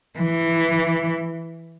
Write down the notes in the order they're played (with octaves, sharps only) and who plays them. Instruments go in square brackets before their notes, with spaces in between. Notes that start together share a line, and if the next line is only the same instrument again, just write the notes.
[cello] E3